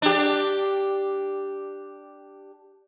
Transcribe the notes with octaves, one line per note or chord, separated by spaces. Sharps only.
D4 G4